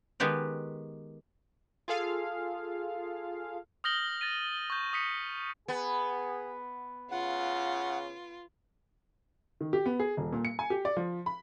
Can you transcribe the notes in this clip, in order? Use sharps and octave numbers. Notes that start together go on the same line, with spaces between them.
D#3 G#3 B3 G4 B4
F4 G#4 A4 F5
D#6 F6 G6 A#6 F#7 G7
A6 A#6 D#7
C#6 G6
D#6 B6 C#7
B3 G#4
C#3 F4 F#5
D#3
G4
B3
G#4
D#1
A#2
C#7
G#5
G4
D5
F3
B5